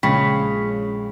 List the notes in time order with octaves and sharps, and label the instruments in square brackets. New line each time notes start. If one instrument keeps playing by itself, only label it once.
[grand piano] A#1 G#3 C#4 [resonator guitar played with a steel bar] C#3 [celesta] G5 B5 B6